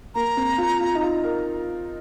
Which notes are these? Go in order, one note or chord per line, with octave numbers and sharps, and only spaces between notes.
A#3 A#5
C4
F4
F4
D#4
F4
A#4